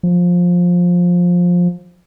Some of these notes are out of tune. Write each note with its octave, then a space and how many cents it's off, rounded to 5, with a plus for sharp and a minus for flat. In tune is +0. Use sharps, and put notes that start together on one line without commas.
F3 +15